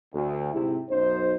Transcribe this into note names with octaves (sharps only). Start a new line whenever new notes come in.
D2
G#2 C3 E4
B1 F#2 D#4 C5